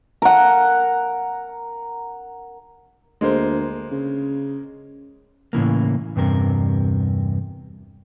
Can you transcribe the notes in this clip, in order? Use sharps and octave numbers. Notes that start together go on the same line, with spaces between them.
A#4 F#5
D2 G#3 A#3 C5
C#3
A2 C#3 E3 A#3
E2 G2 C3 A#4